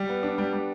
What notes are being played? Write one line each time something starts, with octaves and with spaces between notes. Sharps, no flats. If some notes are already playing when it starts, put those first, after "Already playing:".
Already playing: G3
B3
D4
G3
G3